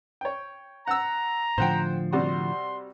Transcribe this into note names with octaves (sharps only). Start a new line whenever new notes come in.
C#5 G5
F#5 A#5 E6
A2 D3 F3 C5 F#5 G5
C3 G3 F#4 C6